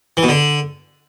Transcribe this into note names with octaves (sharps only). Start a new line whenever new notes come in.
E3
B2
D3